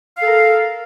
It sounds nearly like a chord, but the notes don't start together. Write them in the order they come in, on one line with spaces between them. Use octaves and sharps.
F5 A4 A#4